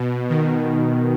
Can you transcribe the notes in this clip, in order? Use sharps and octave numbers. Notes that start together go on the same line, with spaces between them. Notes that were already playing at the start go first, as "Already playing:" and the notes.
Already playing: B2
D#3